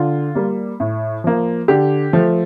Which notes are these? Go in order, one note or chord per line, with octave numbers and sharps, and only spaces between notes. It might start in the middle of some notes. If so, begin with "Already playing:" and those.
Already playing: D3 F4
G3 A#3
A2
F3 A#3
D3 G4
F3 A3